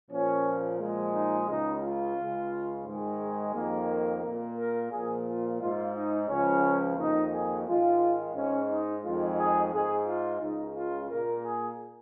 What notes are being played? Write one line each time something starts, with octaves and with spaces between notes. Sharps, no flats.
A#2 F3 A#3 C#4
A#2 F3 G#3
D#4
C#2 C#3 G#3 D#4
F4
C#2 C#3 G#3
G#2 D#3 G#3
G#4
F2 D#3 A#3
A#4
A#2 A#3
A#4
A#2 F3 A#3 G#4
F4
G#2 G#3 F4
D#4
C#2 C#3 F3 C#4
F2 D#3 A#3 D#4
G#4
G#2 D#3 G#3 F4
G#2 G#3 C#4
D#4
F2 D#3 G#3 F4
G#4
G#2 G#3 G#4
F4
C#2 C#3 G#3 D#4
F4
A#2 A#3 A#4
G#4